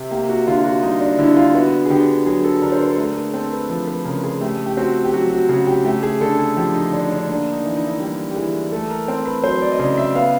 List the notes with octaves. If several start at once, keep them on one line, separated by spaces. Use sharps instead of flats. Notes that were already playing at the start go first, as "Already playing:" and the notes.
Already playing: C3
A#3 G4
F#4
D3 F4
F#4
G3 D#4
D4
D3 E4
F4
B3 F#4
G#4
D3 G4
F#3 G#4
A4
D3 A#4
C5
B4
A4
A3 A#4
G#4
C4 A4
B4
F3 B4
B4
C#3 A#4
G#4
A3 G4
G4
C4 F#4
G4
F#3 F#4
F#4
C#3 F#4
G4
A3 G4
G#4
D3 A4
G#4
F3 G4
D#4
D3 D4
D4
A#3 D4
D#4
E3
D#4
E4
D#4
G3 G4
G4
E3 G#4
A3 A4
A#4
C4 A#4
B4
F#3 C5
D5
D#5
C#3 D5
E5
B3 F5